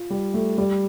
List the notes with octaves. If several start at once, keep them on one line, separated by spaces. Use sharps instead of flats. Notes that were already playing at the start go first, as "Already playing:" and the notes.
Already playing: F4
G3
A3
G3